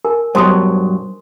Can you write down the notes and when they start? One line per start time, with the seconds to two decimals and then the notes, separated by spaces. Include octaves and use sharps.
0.05 A#4 G#5
0.35 G2 B2 F#3 C5 C6 D#6